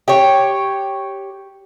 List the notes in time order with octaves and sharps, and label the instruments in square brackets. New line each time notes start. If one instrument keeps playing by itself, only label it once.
[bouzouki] G4 C#5